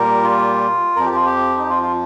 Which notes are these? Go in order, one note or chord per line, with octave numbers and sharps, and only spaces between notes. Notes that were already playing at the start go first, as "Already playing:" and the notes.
Already playing: A#2 G3 A#4
F4
F2 F3 A#4
G4
F4
G4
D#4
F4
F4